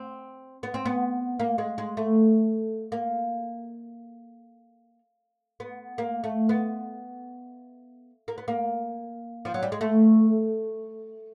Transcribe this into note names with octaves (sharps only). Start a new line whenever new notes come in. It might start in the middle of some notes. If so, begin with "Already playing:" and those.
Already playing: C4
B3
C4
B3
A#3
G#3
G#3
A3
A#3
B3
A#3
A3
B3
A#3
B3
A#3
F3
F#3
G3
G#3
A3